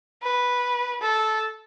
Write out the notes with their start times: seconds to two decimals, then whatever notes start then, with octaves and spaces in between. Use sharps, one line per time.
0.22 B4
1.01 A4